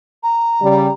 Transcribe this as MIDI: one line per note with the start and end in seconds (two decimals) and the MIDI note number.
0.23 0.92 82
0.62 0.88 49
0.62 0.88 55